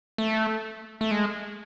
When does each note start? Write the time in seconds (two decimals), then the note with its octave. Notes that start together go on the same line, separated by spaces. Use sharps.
0.18 A3
1.01 A3
1.11 G#3